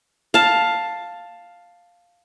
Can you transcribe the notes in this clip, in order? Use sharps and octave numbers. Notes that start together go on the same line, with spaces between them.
F5 A5